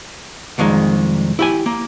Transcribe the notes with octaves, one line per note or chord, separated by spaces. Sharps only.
C2 F2 D#3 G#3
E4 G4 G#5
A#3